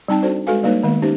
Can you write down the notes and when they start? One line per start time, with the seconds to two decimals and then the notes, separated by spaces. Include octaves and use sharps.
0.08 G3 C4 D#4 G5 A5
0.22 D4 F#4 A4 C5 D5
0.47 G#3 F#4 A4 B4 F5 G#5
0.64 G3 A#3 D#4 B4 C#5
0.83 D#3 G#3 A#3 B3
1.02 C#4 D#4 G4 C5 E5